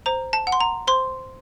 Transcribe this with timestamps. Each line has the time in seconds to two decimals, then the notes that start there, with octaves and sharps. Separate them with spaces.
0.06 C5 A#5
0.33 A5
0.47 F#5
0.52 C6
0.61 A#5
0.87 C5 C6